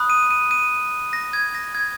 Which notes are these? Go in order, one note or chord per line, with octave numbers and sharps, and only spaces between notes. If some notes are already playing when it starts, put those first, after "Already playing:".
Already playing: B5 D#6 F#6
D#7
D#7
D#7
A#6
G#6
A#6
G#6